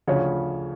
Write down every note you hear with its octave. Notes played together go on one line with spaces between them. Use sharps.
D2 C#3 F3 C#5